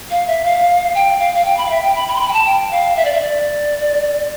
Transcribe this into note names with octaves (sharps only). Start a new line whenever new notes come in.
F5
E5
F5
G5
F5
F5
G5
B5
F5
E5
G5
B5
B5
C6
B5
G5
A5
G5
F5
E5
D5
E5
D5